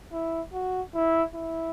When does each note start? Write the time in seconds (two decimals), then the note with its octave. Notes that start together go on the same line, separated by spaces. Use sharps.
0.12 E4
0.53 F#4
0.94 E4
1.35 E4